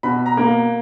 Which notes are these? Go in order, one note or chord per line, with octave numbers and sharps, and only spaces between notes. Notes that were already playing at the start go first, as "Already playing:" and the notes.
B2 B5
A#5
A#3